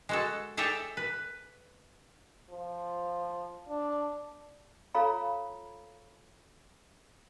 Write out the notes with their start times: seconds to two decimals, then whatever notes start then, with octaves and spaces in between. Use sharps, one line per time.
0.09 G#3 F#4 A4
0.57 G#4 A4 C#5 D5 E5 G5
0.97 B4
2.50 F3
3.68 D4
4.94 F4 A4 C#5 F5 A#5 B5